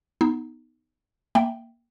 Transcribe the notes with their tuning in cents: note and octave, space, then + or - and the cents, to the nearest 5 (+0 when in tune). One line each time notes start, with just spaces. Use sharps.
B3 +0 D#4 +0
A#3 +0 E5 +0 G5 -10